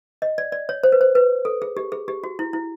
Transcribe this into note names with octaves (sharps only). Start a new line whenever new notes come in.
D#5
D5
D5
C#5
C5
B4
C5
B4
A4
G#4
G4
G#4
G4
F#4
E4
E4